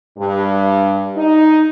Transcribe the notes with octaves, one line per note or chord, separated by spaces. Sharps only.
G2
D#4